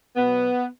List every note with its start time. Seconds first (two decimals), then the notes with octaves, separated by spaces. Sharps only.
0.17 B2 F#3 B3